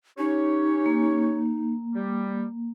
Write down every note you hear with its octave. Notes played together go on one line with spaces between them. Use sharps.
C#4 D#4 G4 C#5
A#3
G3